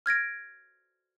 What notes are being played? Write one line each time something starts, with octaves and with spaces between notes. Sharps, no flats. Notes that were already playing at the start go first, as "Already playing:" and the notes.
F6 G#6 A#6 D7